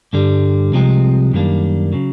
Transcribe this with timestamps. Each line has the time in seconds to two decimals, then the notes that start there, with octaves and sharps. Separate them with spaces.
0.13 G2 D3 G3
0.73 C2 C3 F3 G#3 C4
1.33 F#2 D#3 G3 A#3 D4
1.93 C#3 F#3